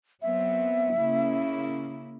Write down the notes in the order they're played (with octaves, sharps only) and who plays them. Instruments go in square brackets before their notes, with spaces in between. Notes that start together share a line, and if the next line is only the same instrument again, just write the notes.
[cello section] F#3 B3 C4 [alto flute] E5
[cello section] C#3 A#3 E4